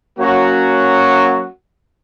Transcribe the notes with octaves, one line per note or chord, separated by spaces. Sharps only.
F#3 A#3 C#4 F#4